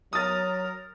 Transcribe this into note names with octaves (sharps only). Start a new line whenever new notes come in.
F#3 A#4 D#6 A6